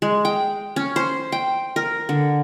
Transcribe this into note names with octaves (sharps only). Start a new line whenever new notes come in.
G#3
G5
C#4
C5
G5
A#4
D3